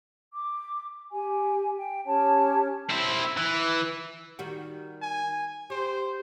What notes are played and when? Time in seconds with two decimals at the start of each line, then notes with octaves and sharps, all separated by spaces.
0.33 D6
1.11 G4 G#5
1.75 G5
2.05 C#4 G4 C#5 A5
2.90 C4 E4
3.37 E3
4.39 D#3 G3 F#4
5.02 G#5
5.70 G4 C5